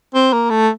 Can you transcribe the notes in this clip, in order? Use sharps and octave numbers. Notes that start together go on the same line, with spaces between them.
C4
A#3
A3